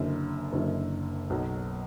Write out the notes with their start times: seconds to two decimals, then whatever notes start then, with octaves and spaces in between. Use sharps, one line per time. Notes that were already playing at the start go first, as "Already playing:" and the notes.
Already playing: F#1 F#2 D3
0.53 F#1 F#2 D3
1.30 B1 B2 F#3